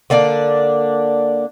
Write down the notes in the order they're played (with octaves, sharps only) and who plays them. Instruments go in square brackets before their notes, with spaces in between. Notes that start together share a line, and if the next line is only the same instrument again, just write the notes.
[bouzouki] D3 A#3 D4 D5